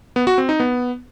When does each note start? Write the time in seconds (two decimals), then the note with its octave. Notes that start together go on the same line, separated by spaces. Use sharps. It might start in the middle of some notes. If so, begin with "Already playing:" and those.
0.16 B3
0.27 F#4
0.38 C4
0.49 D#4
0.60 B3